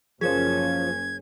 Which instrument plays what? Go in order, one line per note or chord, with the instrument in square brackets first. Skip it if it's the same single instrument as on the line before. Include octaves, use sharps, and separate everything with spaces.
[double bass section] F#1 C#4 [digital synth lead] F3 [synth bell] G#4 A#4 C#5 [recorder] G#6